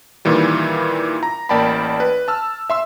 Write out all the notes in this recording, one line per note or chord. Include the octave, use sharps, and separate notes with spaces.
A#2 D#3 E3 G3
A#5
A1 A#3 D5 G5 A5 B5
B4
A5 E6 F6
E5 C6 E6